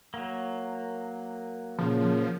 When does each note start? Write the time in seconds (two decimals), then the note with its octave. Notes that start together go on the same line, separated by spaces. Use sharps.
0.14 F#3 A#3
1.79 A#2 C#3 F3